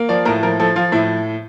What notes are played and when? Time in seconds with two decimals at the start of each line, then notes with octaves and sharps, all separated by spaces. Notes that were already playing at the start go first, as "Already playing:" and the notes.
Already playing: A#3
0.09 F3 D5
0.25 A2 A#4
0.43 F3 A#4
0.59 F3 A4
0.76 F3 F4
0.92 A2 E4